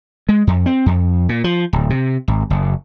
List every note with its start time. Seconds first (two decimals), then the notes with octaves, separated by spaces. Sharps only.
0.29 G#3
0.47 F2
0.66 C4
0.86 F2
1.29 A#2
1.44 F3
1.73 D1
1.90 C3
2.28 G#1
2.50 F#1